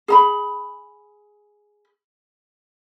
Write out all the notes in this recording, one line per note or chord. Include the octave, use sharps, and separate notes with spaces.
G#4 A#5 B5